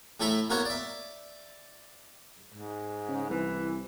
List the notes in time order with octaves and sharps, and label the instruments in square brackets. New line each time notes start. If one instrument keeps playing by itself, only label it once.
[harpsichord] A2 A3 E4 A4 E5 A#5
A#3 B3 F#4 A#4 C#5 F#5
D5 E5
[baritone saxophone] G#2
[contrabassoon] C#3
[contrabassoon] C2 [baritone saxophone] E3